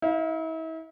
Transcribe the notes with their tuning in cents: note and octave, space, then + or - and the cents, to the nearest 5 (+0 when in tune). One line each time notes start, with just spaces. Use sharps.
E4 -40 F5 +0